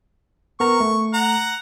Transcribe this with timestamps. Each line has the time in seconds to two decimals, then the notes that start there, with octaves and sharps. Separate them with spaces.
0.60 B3 A#4 A#5 C#6
0.80 A3
1.14 F#5 A#5